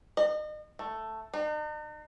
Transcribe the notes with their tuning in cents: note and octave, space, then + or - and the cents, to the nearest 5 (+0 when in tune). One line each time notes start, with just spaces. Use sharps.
D#5 -35
A3 +5
D#4 -45